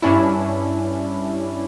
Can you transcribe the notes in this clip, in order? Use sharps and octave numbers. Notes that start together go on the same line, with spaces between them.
G2 C#4 D4 E4